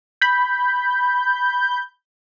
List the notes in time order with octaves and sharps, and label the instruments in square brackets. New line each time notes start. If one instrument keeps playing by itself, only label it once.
[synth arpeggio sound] B5 G6